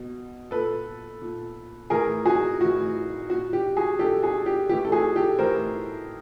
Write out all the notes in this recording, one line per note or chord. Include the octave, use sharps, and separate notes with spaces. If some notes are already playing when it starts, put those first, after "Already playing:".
Already playing: B2
A#2 A4 B4
A#2
A2 E3 G#4 A#4
F#4 G#4
A2 E3 F#4
A#2 F#4
G4
F#4 G#4
A#2 G4 A4
F#4 G#4
G4
A2 E3 G4
A4
F#4 G#4
G4 A4
A2 E3 A#4 C5